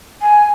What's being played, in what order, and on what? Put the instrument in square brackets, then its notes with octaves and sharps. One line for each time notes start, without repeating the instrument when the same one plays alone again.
[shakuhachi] G#5